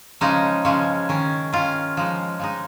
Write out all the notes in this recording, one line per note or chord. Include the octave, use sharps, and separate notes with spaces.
C#3 F3 G#3 C#4 D#4
C#3 F3 G#3 C#4
D#3 C#4
D#3 C#4 F4
F3 G#3 D#4
F3 G#3 D#4